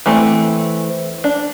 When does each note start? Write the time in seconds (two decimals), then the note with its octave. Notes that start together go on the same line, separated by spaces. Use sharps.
0.06 E3 A3 C4
1.24 D4